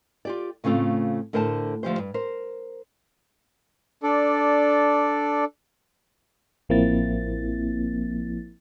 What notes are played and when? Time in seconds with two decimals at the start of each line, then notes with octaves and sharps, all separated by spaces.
0.25 F4 G4 D5
0.64 A2 C#3 A3 C4 F4
1.33 A2 D3 A#4 C5 F5 A5
1.83 D2 F3 G4 C5
1.98 G2
2.14 A#4 C5
4.03 D4 A4 D5
6.69 A1 F3 A#3 C4 E4 A6